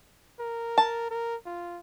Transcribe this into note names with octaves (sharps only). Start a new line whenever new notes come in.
A#4
A5
A#4
F4